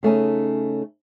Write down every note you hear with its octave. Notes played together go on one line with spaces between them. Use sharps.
C#3 A3 C#4 D#4